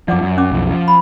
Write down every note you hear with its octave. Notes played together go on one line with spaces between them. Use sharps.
F#2 F3 D5 F#5 D6
F#2
C#4 F#5 D6
B1 F2
F3
B5